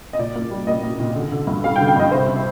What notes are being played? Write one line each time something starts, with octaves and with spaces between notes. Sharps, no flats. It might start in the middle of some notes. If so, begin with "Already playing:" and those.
D#5
A#2 D5
A#3
G3
A#3 D#5
A#3
A#2
D3
D3
G2
G3 F5
G5
D3
G5
G2 D#5
C3 C5
C3